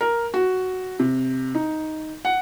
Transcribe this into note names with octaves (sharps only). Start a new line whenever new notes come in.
A#4
F#4
C3
D#4
F#5